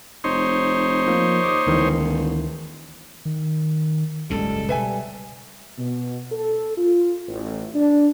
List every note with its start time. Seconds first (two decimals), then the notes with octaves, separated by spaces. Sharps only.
0.24 F1 D#4 C5 C#5
1.07 F3 A#3
1.44 D#2 D6 D#6
1.67 E1 D2 D#3 E3
3.25 D#3
4.30 F#1 C#2 G#2 C#3 G3 G#3 A4
4.69 B2 G3 B4 E5 G#5
5.78 B2
6.31 A4
6.78 F4
7.28 A1
7.74 D4